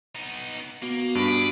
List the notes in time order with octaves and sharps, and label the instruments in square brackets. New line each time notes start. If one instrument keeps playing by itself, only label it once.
[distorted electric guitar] B3 D#4
[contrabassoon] B2 [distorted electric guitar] A#3
[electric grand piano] G2 [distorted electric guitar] G#4 [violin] B5 D6